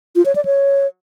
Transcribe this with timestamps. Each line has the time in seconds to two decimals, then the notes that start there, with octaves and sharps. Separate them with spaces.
0.16 F4
0.26 C#5
0.35 D5
0.45 C#5